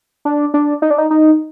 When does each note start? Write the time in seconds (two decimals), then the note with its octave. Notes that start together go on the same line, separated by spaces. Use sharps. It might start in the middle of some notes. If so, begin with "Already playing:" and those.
0.25 D4
0.54 D4
0.82 D#4
0.90 D4
0.98 D#4
1.11 D#4